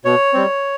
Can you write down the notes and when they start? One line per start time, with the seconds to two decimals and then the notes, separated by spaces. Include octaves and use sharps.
0.05 B2 C#5
0.34 G3 C4